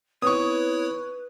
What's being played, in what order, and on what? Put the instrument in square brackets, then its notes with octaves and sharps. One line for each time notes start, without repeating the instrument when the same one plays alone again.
[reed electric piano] B3 C4 D#4 [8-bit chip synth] E4 C#5 [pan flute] B4 [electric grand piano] C#6 D#6